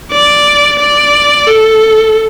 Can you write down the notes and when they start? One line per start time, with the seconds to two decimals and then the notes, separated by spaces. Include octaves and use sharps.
0.12 D5
0.79 D5
1.48 A4